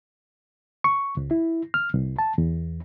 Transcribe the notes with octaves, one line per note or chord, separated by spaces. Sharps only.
C#6
C#2
E4
F6
C2
A5
E2